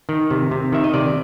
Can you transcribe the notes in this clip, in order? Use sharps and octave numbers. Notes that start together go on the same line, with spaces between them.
D#3
C3
C3
D#3 E5
D#5
C3 D5